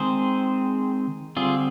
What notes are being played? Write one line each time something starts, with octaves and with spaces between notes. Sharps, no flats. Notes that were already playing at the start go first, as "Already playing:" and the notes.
Already playing: D#3 G#3 C4 G#4 C5
D3 G3 C4 F4 G#4